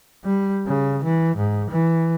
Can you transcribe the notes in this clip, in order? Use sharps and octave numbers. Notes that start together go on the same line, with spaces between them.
G3
C#3
E3
G#2
E3